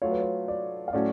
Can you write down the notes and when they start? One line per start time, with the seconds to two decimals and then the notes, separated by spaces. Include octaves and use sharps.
0.02 F#3 A3 F4 C#5
0.11 B4
0.21 C#5
0.48 D5
0.88 F5
0.93 A2 F#3 A3 C#4 F#4 D5